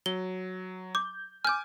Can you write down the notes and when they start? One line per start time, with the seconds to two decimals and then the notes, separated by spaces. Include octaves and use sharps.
0.06 F#3 G7
0.95 D6 G6
1.45 G#5 D6 F6 G6